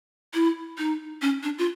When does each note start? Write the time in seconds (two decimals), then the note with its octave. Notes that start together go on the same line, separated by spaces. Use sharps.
0.34 E4
0.78 D#4
1.22 C#4
1.43 D4
1.58 F4